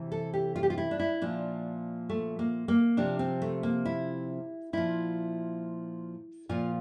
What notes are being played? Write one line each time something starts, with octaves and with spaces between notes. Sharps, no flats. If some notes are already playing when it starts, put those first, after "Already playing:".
Already playing: C3 E3
A4
G4
F4
G4
F4
E4
D4
E4
A#2 F3 D4
A3
A#3
A#3
C3 F3 D4
C4
A3
A#3
E4
A#2 F3 E4
A#2 F3 F4